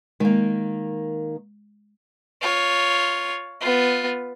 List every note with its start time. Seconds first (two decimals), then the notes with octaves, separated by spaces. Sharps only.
0.20 D#3 G#3 A#3
2.41 F4 C#5
3.61 B3 F4